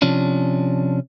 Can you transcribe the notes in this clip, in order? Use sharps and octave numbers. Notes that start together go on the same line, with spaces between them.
C3 F3 C#4 D4